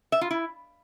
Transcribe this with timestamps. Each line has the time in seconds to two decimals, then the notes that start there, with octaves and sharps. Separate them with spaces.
0.12 E5
0.21 F4
0.31 E4